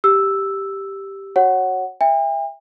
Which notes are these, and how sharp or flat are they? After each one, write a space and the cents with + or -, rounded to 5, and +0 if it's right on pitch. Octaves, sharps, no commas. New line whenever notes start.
G4 +0 E6 +0
F#4 +0 C#5 -15 F#5 +5
E5 +0 G5 +45